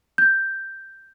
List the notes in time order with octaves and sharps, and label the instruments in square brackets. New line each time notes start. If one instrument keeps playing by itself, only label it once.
[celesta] G6